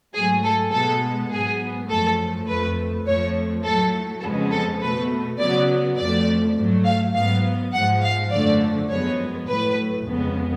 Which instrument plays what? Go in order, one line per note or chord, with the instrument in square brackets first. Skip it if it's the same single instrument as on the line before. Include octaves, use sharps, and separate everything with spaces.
[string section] G#2 F#3 A3 G#4
A4
B2 G#3 B3 A4
G#2 F#3 B3 G#4
F#2 F3 A3 A4
F2 F3 A3 B4
F2 F3 A3 C#5
A2 F#3 A3 A4
F2 C#3 G#3 B3 A4
A4
B2 A3 B4
C#3 F#3 B3 D5
F2 F3 A3 D5
G#2 F#3 A3
F5
G#2 F#3 B3 F5
G#2 F3 G#3 F#5
F5
F#2 D3 F3 A3 D5
F#2 F3 G#3 B3 C#5
A2 F#3 A3 B4
F2 C#3 G#3 B3